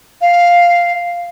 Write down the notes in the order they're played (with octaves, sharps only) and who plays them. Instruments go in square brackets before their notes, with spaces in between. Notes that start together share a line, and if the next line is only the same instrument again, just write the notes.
[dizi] F5